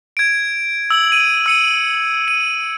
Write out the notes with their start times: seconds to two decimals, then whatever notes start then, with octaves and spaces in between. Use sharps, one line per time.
0.17 G#6 D7
0.90 E6 F#7
1.12 D#7
1.46 E6 C#7 D#7
2.28 D#7